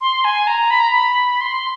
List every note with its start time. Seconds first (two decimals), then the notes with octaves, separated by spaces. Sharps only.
0.01 C6
0.24 G#5
0.47 A#5
0.70 B5
0.80 A#5
0.91 B5
1.41 C6